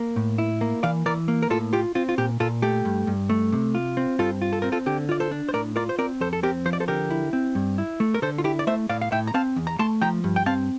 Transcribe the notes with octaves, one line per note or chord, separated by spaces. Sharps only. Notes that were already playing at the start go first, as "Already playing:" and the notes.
Already playing: A#3
A2
E4
A#3
E3 D5 F5
E3 A#4 D5
A#3
A#4
A2 F4 A4
F4 G4
C4 F4
F4
A#2 G4
A#2 F4 A4
A3 G4
G2
G2
A3
C3
F4
C4
G2 F4 A4
F4
A4
C4 A#4
F4 A4
D3 G4
F4 D5
A4 C5
D4
C5
A2 A#4 D5
F4 A#4 D5
C5
C4 A#4 D5
F2 A4 C5
A4
C4 G4 A#4
F3 C5
D5
A4 C5
D3 G4 A#4
E4
C4
G2
E4
A3
A#4
D3 A4 C5
F4
E4 G4
D5
A3 C5 E5
A2 D5 F5
F5
A2 E5 G5
A#5
C4 F5 A5
E2
A#5
A3 A5 C6
F3 G5 A#5
G2
G5
C4 F5 A5